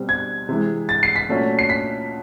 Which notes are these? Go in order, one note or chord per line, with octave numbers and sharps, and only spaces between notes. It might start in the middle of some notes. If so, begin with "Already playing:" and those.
Already playing: B2 G3 C4
G#6
C3 E3 G#3
A6
C7
B6
A#2 F#3 A3 C#4 F4
C7
B6